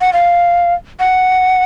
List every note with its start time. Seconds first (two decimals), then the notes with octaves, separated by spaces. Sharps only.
0.01 F#5
0.13 F5
1.00 F#5